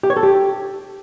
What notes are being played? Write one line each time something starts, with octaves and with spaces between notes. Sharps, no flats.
G4
C#5
A4
G4